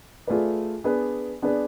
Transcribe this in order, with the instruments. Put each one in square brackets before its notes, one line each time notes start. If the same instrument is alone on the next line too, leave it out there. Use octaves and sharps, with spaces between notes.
[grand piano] A3 F4 G#4 B4 D5
B3 D4 G#4 B4 D5
B3 D4 G#4 B4 D5